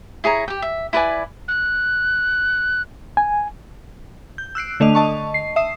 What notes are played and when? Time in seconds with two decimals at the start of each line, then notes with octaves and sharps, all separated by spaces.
0.24 E4 G#4 C#5 A#5
0.48 G4 G5
0.62 E5
0.93 E4 B4 D5 G#5
1.48 F#6
3.17 G#5
4.38 G6
4.55 E6 F#6 C7 D7
4.80 D3 A3 D4 D#5 F7
4.95 D#5 A5 C#6
5.34 C7
5.56 E5 D#6 C7